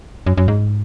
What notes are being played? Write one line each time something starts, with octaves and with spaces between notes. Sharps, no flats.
F#2
F#2
G#2